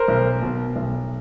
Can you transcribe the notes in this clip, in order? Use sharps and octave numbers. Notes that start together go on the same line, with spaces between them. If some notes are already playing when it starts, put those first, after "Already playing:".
Already playing: A#4 C5
B1
B2
B1